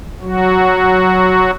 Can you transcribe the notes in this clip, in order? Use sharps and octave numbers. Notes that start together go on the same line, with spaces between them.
F#3 F#4